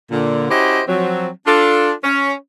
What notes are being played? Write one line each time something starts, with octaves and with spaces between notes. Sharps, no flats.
A#2 D3
C#4 E4 F#4 G4 C5 D#5
F3 F#3 C4
D4 F4 A4
C#4